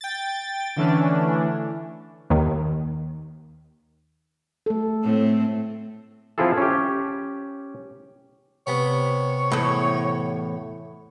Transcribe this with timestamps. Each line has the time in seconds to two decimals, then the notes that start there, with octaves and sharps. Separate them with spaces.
0.01 G5 A6
0.76 D3 E3 A3 C#4 D4
2.30 D#2 D#3
4.66 A3 A4
5.03 A2 C4
6.38 F3 C4 E4 F4 G#4 A4
6.58 C#4 G4
8.67 C3 B3 C#5
9.52 E2 A2